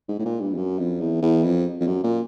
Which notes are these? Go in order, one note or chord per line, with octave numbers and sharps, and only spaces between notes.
G#2
A2
A#2
G2
F2
F#2
F2
E2
E2
F2
F2
F#2
A#2